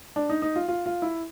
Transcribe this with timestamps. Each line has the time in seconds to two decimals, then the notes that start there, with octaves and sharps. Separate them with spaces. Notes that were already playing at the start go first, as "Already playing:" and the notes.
0.16 D4
0.29 D#4
0.42 D#4
0.56 F4
0.68 F4
0.86 F4
1.02 E4